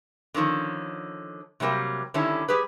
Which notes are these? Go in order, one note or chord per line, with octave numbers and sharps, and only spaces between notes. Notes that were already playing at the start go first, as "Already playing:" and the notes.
D3 D#3 F3 C#4
C3 F#3 G3 A#3
D3 D#3 G3 C#4 E4 A4
G3 G4 G#4 B4